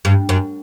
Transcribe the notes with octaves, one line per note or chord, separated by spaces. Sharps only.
G2
F#2